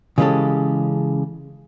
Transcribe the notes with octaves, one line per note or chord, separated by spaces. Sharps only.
C#3 E3 G#3 C#4 G4 A4